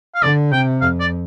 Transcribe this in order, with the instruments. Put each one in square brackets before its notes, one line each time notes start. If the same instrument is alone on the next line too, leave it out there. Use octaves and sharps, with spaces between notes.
[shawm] F5
[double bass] D3 [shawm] D5
[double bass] C3 [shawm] G5
[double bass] F2 [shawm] F5
[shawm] D5